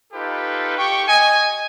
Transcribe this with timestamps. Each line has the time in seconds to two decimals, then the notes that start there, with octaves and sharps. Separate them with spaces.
0.12 D#4 F4 G4 A4 B4
0.77 G4 G5 C#6
1.08 D#5 G#5